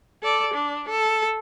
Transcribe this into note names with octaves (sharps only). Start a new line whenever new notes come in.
A4 D5
D4
A4